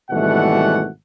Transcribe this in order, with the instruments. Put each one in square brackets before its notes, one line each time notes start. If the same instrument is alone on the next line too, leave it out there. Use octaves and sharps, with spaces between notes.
[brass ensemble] G#1 B2 E3 G3 A3 F#5